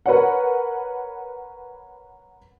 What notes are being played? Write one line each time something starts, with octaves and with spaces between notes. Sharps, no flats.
A#4 B4 C#5 F#5